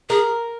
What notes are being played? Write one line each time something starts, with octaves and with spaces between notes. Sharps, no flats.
G#4 A#4